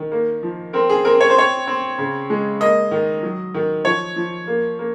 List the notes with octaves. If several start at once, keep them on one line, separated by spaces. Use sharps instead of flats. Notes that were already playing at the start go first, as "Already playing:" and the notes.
Already playing: D#3
A#3
F3
C4 A#4
G#4
C4 A#4
C#5
C5
C4 C#5
C4
C#3
G#3
A#3 D#5
D#3
F#3
D#3
F3 C#5
F3
A#3
A#3